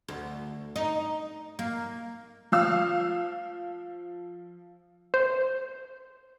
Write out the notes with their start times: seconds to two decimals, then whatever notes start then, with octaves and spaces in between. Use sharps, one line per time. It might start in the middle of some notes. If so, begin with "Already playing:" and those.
0.08 D2
0.76 D#4
1.59 A#3
2.52 F3 F5 E6
5.14 C5